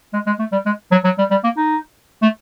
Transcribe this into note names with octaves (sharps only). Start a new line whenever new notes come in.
G#3
G#3
A3
G3
G#3
F#3
F#3
G3
G3
A#3
D#4
A3